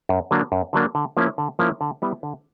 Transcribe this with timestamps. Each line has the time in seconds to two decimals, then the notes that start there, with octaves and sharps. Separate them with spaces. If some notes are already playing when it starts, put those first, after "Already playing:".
0.09 F#2
0.31 D3 F#3 A#3 D4
0.52 F#2
0.73 D3 F#3 A#3 D4
0.95 D3
1.17 F3 A#3 C#4 E4
1.38 D3
1.59 F3 A#3 C#4 E4
1.81 D3
2.02 G3 B3 E4
2.23 D3